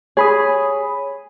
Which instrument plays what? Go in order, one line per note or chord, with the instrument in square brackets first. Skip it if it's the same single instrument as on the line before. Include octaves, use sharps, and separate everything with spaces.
[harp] G#4 [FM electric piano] C#5 B5 D#6